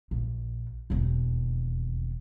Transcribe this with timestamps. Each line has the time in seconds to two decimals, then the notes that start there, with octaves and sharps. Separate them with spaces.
0.11 A#1
0.90 E1 D#2